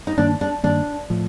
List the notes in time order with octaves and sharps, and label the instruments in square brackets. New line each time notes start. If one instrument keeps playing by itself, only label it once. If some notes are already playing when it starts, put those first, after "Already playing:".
[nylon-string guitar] D#4
[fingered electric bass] G2 D#3 A#3 [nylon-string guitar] D4
[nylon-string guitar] D4
[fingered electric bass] G2 D#3 A#3 [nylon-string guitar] D4
[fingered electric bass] A2 F3